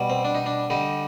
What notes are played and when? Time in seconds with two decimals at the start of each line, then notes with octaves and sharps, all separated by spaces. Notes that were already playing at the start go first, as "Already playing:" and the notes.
Already playing: B2 G3
0.10 C4
0.25 D4
0.35 D#4
0.46 D4
0.70 D3 G3 D#4